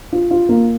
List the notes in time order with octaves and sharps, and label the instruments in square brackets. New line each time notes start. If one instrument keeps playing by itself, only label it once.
[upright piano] F4
F4
A#3